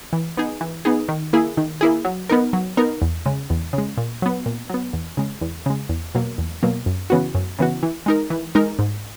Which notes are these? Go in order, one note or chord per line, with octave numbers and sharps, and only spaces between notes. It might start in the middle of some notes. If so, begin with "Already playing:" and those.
E3
B3 D#4 G#4
E3
B3 D#4 G#4
D#3
A#3 E4 G#4
D#3
A#3 E4 G#4
F#3
B3 D#4 A#4
F#3
B3 D#4 A#4
E2
C#3 G#3
E2
C#3
G#3
A#2
F#3 B3
A#2
F#3 B3
E2
C#3 G#3
E2
C#3 G#3
E2
B2 F#3 A#3
E2
B2 F#3 A#3
F#2
C#3 E3 B3 F#4
F#2
C#3 E3 B3 F#4
E3
G#3 D#4 A#4
E3
G#3 D#4 A#4
G#2